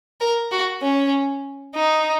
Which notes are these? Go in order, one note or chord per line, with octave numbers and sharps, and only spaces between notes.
A#4
F#4
C#4
D#4